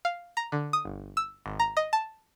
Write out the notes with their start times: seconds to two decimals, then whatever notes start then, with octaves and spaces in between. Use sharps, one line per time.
0.05 F5
0.37 A#5
0.52 D3
0.73 D#6
0.85 G1
1.17 E6
1.46 G#1
1.60 A#5
1.77 D#5
1.93 A5